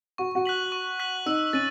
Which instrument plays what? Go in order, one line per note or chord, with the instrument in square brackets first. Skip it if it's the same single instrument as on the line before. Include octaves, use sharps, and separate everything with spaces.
[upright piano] F#4 [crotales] C#6
[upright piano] F#4
[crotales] F#6 B6 F#7
C#6
F#6 B6 F#7
[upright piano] D#4 [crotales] E6
[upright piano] C#4 [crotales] A6 D#7